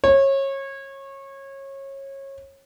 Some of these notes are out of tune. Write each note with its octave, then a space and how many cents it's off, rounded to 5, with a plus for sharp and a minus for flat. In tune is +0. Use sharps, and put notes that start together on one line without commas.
C#5 -25